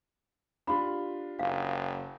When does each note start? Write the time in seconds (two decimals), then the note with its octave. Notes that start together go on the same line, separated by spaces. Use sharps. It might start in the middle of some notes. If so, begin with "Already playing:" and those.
0.67 D4 F4 G4 B5 C6
1.39 F#1 F5